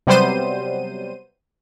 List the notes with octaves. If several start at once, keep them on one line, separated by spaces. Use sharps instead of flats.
C3 F#3 G3 B3 C5 D#7